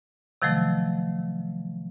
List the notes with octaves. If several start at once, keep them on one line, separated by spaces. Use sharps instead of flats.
C3 D#3 F3 F#3 A3